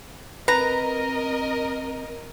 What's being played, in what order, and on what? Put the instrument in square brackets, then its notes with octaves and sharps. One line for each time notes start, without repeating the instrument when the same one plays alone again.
[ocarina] C4 [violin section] A#4 D#5 [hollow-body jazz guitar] B4 [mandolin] A#5